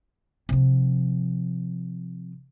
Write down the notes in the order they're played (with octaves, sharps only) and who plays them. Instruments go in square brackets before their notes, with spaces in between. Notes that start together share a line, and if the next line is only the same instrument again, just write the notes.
[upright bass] C3 F3